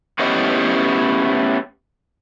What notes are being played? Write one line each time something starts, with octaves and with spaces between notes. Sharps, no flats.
A3 B3 C#4 E4 G4 D#5